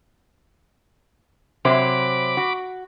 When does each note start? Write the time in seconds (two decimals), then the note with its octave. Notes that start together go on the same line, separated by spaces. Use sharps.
1.65 C3 F#3 C5 B5 D6
2.37 F#4